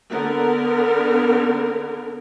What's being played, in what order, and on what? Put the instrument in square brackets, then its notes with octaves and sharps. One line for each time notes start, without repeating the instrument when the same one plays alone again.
[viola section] D3 B3 A#4